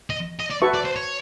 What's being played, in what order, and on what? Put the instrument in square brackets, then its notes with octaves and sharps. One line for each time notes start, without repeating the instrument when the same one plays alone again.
[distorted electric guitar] D#5
D#5
D5
[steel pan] F#4 B4 E5 A5 C#6
[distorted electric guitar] D5
C5
C#5